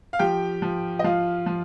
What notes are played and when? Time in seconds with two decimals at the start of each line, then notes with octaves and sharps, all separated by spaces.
0.13 F5
0.19 F3 G4 G5
0.62 F3
0.99 D#5
1.04 F3 F4 F5
1.46 F3